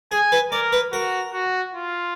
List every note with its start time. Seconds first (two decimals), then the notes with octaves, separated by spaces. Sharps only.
0.12 G#4 G#5
0.32 B4
0.52 A#4 D5
0.73 B4
0.92 F#4 A#4
1.33 F#4
1.75 F4